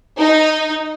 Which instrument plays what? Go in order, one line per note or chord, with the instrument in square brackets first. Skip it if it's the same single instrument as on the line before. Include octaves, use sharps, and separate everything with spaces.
[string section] D#4